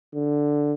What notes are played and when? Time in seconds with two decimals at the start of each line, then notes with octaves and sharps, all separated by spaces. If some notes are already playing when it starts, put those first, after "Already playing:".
0.14 D3